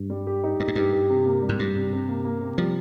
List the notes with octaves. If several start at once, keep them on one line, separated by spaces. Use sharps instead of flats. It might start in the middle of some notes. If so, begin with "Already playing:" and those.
Already playing: G2
G3
G4
D#4
G2 D#4
G#2
G2 G4
G4
C3
A#3
G3
G#2
G2 G3
C3
C3
A#3
A#3
C3
F3 G3